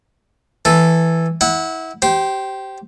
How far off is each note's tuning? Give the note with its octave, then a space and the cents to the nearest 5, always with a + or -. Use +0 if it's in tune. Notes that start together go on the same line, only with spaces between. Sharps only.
E3 +0 A4 +0
E4 -25 F#5 +0
G4 -20 C5 +0